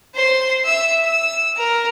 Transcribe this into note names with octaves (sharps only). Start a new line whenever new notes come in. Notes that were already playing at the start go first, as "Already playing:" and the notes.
C5 C6
E5 E6
E6
A#4